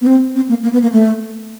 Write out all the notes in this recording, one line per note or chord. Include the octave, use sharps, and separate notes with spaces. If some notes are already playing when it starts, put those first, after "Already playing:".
B3
C4
C4
A#3
A#3
B3
A#3
A3